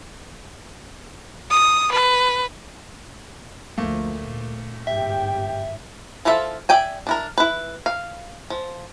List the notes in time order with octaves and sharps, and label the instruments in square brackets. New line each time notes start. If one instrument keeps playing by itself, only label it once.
[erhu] D#6
B4
[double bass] D2 F3 [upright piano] A3 A#3
[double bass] A#2
[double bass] G1 G#2 [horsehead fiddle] G4 G5 [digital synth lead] E5
[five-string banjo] F3 E4 F4 A4 E5
D5 E5 G5 G#5
D4 E4 A#4
E4 B4
F5
F3